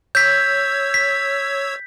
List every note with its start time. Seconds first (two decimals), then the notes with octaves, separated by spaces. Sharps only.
0.15 C#5 E6 G6 G#6 B6
0.94 B6